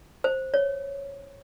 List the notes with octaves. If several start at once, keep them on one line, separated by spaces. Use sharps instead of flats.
C5
C#5